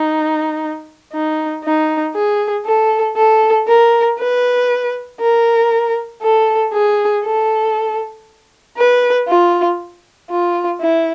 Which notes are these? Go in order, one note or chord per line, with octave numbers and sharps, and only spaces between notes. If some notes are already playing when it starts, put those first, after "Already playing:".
Already playing: D#4
D#4
D#4
G#4
A4
A4
A#4
B4
A#4
A4
G#4
A4
B4
F4
F4
E4